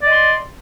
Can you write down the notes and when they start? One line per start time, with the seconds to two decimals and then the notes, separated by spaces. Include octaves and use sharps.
0.02 D5
0.06 D#5
0.10 C6